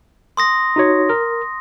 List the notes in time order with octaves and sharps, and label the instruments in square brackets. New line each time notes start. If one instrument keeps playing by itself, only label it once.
[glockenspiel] C6 D#6 A#6
[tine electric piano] D#4 F#4 C#5
A#4